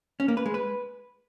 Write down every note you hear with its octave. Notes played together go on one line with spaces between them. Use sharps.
C#4
A#3
B4
G#3
B4